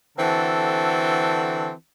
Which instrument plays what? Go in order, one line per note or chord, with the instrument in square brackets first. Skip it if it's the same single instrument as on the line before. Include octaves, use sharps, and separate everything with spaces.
[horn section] D3 E3 C4 F#4 A4